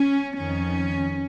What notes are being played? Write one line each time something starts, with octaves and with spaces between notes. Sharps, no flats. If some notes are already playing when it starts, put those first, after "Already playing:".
Already playing: C#4
F2 D#3 C#4